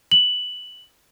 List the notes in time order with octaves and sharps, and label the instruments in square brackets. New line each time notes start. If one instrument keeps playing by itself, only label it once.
[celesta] F#7